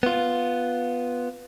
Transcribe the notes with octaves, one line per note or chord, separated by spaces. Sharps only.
B3 F4